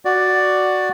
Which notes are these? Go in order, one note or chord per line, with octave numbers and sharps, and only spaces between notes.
F#4 D5